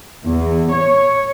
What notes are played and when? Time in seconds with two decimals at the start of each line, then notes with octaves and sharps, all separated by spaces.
0.25 E2
0.72 C#5